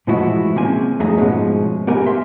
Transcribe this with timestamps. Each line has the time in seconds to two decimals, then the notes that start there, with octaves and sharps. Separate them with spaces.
0.07 A2 E3 F3 G#3 E4 F#4
0.55 C#3 A#3 C4 G#5
0.99 F2 F#3 A3 G#4 E5 A#5
1.17 G#2 B2 F3 G#3 C#4
1.87 B3 G4 A#4 F#5 G#5
2.06 E5 C6